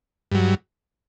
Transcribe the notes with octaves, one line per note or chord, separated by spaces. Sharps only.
G2 F#3